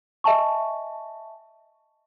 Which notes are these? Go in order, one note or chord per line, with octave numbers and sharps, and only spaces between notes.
D#5 E5 G#5 A5 C#6